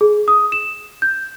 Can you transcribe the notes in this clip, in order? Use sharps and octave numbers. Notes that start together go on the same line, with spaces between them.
G#4
D#6
E7
G6